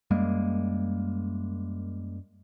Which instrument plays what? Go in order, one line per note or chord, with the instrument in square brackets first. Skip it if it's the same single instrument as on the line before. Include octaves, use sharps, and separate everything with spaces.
[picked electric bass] F#2 G3 G#3 A#3